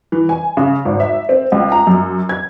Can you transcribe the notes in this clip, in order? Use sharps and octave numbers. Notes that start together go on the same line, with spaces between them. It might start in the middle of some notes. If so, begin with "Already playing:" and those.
E3
G#5
C#3
G#1
E5
C4
C#2
A#5
F#2
G#6